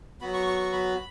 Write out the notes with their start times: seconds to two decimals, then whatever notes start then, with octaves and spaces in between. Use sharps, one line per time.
0.21 F#3 B3 F#4 B5
0.34 C#6
0.47 C#6
0.60 C#6
0.73 B5